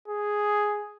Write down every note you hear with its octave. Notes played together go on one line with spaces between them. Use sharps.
G#4